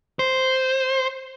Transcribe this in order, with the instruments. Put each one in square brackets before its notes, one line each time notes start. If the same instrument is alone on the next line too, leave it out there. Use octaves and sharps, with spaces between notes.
[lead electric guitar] C5